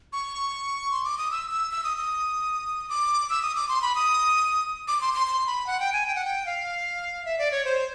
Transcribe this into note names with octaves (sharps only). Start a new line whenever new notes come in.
C#6
C6
D6
D#6
E6
E6
E6
D#6
D#6
D6
E6
D#6
D6
C6
B5
D#6
D6
C6
C6
C6
B5
F#5
G5
G#5
G5
F#5
G5
F5
E5
D5
C#5
C5